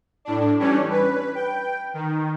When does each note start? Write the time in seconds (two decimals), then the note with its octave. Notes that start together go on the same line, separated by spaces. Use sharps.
0.25 A2 D4
0.59 E3 G3 C#4 D4 C#5
0.90 B4
1.35 G5
1.94 D#3